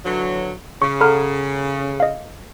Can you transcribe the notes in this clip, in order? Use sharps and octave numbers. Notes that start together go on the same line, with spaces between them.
D3 E3 F#3
C#3 C#6
A4 F#5 A#5 B5 F6
D#5 F5